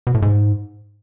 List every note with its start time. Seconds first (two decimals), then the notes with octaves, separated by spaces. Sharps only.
0.07 B2
0.14 A2
0.22 G#2